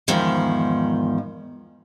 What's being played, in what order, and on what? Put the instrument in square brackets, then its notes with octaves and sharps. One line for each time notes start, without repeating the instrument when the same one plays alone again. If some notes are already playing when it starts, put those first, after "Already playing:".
[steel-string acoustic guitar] E2 G#2 D#3 F3